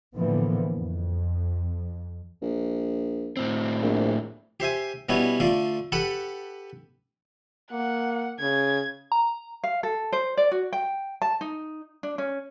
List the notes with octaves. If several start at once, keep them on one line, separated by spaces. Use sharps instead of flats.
A2 D3 E3 F3 A#3 B3
F2
A#1
A2 C4
A#1
G4 C5 E5 G#5
B2 G3 B3 C#4 E4
D3 A3 F4 D5
G4 A4 B4 F#5 A5
A#3 F#5
C#3 G#6
A#5
F5
A4
C5
D5
F#4
G5
A5
D#4
D4
C#4